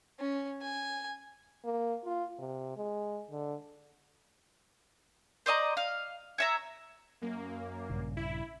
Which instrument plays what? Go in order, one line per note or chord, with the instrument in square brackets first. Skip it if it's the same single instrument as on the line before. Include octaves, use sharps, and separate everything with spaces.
[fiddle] C#4
G#5
[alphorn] A#3
F4
C3
G#3
D3
[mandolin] C5 D5 D#5 A#5
F5
C#5 E5 A#5
[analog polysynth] F#2 A#3
[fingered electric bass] A#1 G2 C#3
[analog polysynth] E4